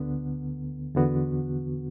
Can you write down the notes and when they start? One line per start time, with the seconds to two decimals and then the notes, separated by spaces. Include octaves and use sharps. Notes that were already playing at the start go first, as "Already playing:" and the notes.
Already playing: D2 D3 B3
0.95 E2 D3 B3 F#4